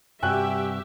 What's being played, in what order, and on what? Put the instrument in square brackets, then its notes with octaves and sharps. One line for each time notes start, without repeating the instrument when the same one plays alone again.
[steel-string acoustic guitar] G2 C3 F#4 [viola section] G4 E5 [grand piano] G5 G#5 F#6